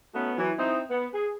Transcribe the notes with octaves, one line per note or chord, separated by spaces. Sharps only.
A3 B3 C#4 D#4 F#4 B4
E3 F#3
C4 D#4 E4
B3
G#4